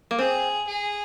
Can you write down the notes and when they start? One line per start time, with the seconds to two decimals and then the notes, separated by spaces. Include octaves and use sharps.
0.11 A#3
0.19 C4 G#4
0.67 G#4